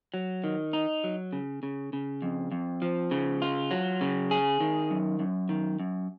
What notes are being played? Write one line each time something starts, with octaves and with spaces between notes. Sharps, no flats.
F#3
D#3
D#4
F#3
C#3
C#3
C#3
F2
F2
F3
C#3
F4
F#3
C#3
G#4
D#3
F#2
F#2
D#3
F#2